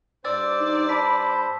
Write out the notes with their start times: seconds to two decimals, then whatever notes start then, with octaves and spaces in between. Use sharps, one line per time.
0.25 G2 C5 D5 D6 E6 A6
0.60 D#4
0.89 A5 B5 B6